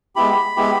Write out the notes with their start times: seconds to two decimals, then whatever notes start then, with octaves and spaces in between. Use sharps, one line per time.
0.16 G#3 B3 E4 G4 B5
0.56 G#3 B3 E4 G4